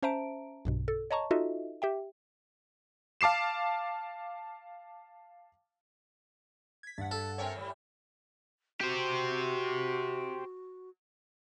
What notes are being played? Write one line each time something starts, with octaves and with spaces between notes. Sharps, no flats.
C#4 C5 E5 A5 A#5 D7
B1 G2 B2
A4
C#5 D#5 A5 A#5 C#6
D#4 F4 F#4 A4 D#5 E5
G4 E5 G5
F5 A5 D6 C7 E7
G#6 B6
G2 F#5 A6
A4
C4 A#4 C#5 E5 G5 G#5
A2 G3
F#4 G4 C5